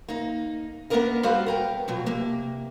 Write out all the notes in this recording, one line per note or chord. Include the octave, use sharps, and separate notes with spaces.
A#3 D#4
A#3 B3 C#4 D4 A#4 D#5
G3 F#4 A4 B4 C5 F5
B3 A#4 G5
B2 F3 F#3
C3 A#3